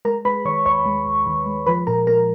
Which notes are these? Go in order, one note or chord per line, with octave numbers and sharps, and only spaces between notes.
G#3 A#4 A#5
G#3 B4 B5
D#3 C#5 C#6
D#2 C#5 C#6
G#3
D#2
D#3
G#3
F3 B4 B5
A#2 A#4 A#5
A#2 A#4 A#5